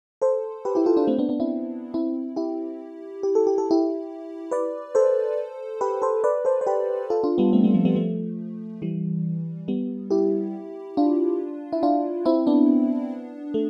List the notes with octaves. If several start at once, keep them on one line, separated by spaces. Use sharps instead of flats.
A4 C5
G4 B4
E4 G4
F4 A4
D4 F4
A3 C4
B3 D4
B3 D4
C4 E4
C4 E4
E4 G4
G4
A4
G4
A4
E4 G4
B4 D5
A4 C5
G4 B4
A4 C5
B4 D5
A4 C5
C5
G4 B4
F4 A4
D4 F4
G3 B3
A3 C4
G3 B3
F3 A3
G3 B3
F3 A3
E3 G3
G3 B3
E4 G4
D4 F4
E4
D4 F4
C4 E4
B3 D4
A3